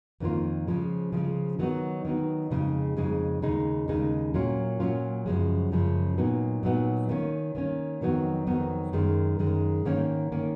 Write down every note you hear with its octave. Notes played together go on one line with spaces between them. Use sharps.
F2 D#3 A#3 F4
C#3 F3 G#3
C#3 F3 G#3
D#3 F#3 B3 D#4
D#3 F#3 B3 D#4
F2 C#3 G#3 D#4
F2 C#3 G#3 D#4
D#2 C#3 G#3 D#4
D#2 C#3 G#3 D#4
A#2 F#3 A#3 C#4 F4
A#2 F#3 A#3 C#4 F4
F#2 C#3 F3 G#3
F#2 C#3 F3 G#3
A#2 F#3 B3 D#4
A#2 F#3 B3 D#4
D#3 A#3 C#4
D#3 A#3 C#4
F2 D#3 F#3 B3 D#4
F2 D#3 F#3 B3 D#4
F#2 D#3 G#3
F#2 D#3 G#3
G#2 D#3 A#3 C#4
D#3 A#3 C#4